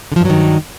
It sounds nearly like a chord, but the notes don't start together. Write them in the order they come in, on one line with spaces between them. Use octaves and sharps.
D3 F3 G2 F#3 D#3